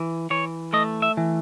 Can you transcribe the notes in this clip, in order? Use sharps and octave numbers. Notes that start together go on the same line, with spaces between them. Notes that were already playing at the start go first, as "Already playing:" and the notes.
Already playing: E3
E3 C#5
A3 D#5
E5
E3